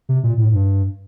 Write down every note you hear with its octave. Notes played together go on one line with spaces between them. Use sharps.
C3
A#2
A2
G2